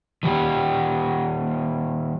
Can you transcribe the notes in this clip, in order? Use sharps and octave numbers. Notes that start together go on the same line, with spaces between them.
D#3 G3 G4